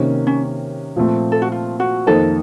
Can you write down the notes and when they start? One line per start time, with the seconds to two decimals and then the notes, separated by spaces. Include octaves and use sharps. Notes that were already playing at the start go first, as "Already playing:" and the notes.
Already playing: C3 D#3 A#3 C#4
0.27 C#4
0.96 A#2 F3 A3 C4
1.32 A4
1.42 F#4
1.52 F4
1.80 F#4
2.07 F2 D#3 A#3 D#4 A4